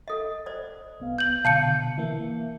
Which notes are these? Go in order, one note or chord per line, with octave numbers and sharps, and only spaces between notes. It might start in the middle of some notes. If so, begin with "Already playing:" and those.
A4 D#5
C5 D5
C2 B3 F5
G6 F#7
B2 D3 F5 A5 G6 C#7
E3 A#3 E5